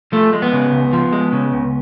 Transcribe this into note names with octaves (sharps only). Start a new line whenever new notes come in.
F3 A3
G#3
B3
C#3
C#2
F3
G#3
C#3
C#2